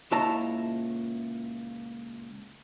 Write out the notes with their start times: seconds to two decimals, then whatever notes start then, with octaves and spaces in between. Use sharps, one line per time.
0.11 C#2 A#2 E4 C#5 A5 A#5